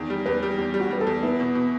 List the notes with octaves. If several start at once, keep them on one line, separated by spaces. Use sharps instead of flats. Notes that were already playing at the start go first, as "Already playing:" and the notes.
Already playing: E2 D#3
G3
E2 B4
G3
E2 G4
G3
F#4
G3 B4
A4
E2
B3 E4
B2
B2